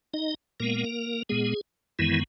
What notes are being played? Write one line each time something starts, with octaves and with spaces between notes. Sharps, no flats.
D#4 D#5
A#2 G#3 A#3 B3 A#4
A#2 G#3 B3 G#4
F#2 D#3 E3 G#3 B3 E4